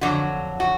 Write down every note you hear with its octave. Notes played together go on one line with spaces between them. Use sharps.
F2 D3 F#3 F#4
F#4